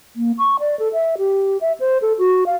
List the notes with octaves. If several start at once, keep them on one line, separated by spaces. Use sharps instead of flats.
A#3
C#6
D5
A4
E5
G4
E5
C5
A4
F#4
F5